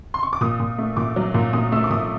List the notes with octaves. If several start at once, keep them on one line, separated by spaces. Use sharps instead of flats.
C6
C#6
D6
A#2 D#6
A#2
A3
A#2 D6
F#3
A#2
A#2 D#6
A3 E6
D6
A#2 D#6